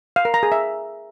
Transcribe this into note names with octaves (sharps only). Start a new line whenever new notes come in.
F5
A#4
A#5
G#4
E5